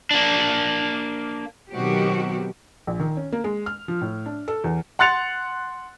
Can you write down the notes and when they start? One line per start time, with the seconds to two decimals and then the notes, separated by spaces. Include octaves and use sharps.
0.11 A#3 D4
1.72 B2 D#3 F#3 C4 F#4 G4
2.87 A#1
2.99 D#3
3.17 C#4
3.33 A#3
3.44 G#3
3.66 F6
3.88 F3
4.01 A2
4.26 D4
4.48 A4
4.64 E2
4.99 F#5 C6 F#6 A6 C#7 F7